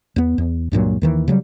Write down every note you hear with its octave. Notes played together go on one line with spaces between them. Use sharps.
E2 B3
E2
C#2 G2 A#2 F#3
D#2 D#3 E3
C#3 F#3 G3